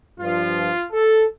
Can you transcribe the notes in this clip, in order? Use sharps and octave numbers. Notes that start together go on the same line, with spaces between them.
G2 F3 F4
A4